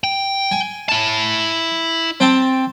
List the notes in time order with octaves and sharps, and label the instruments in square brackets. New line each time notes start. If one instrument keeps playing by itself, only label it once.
[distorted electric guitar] G5
[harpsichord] G#5
[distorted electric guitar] E4 A5
[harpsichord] C4 G5 A5